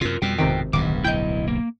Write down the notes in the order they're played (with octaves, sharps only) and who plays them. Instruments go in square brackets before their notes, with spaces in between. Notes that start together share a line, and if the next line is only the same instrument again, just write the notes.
[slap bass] F#2 C3 [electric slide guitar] F4 A#4
[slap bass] F2 B2 [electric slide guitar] G3 G5
[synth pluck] G#1 C3 D#3 [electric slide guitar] G5
[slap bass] D1 B1 G2 [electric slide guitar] D#3 [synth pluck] D6
[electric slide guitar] E4 D#5 [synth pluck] G5 G6
[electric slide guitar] A#3